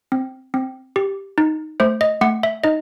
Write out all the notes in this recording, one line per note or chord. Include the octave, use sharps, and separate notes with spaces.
C4
C4
G4
D#4
A3 C5
D#5
A3 F#5
E5
D#4 D#5